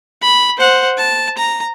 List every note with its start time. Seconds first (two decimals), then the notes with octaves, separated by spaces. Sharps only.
0.22 B5
0.57 C5 F#5
0.98 A5
1.38 A#5